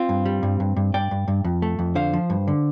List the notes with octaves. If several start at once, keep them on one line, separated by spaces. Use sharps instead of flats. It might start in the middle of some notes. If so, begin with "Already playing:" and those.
Already playing: C4 F4
G2
G3
G2
G2
G2
G2 D5 G5
G2
G2
F2
A3
F2
D3 C5 F5
F3
G2
D3